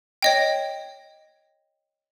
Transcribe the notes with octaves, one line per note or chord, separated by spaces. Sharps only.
C#5 D#5 G5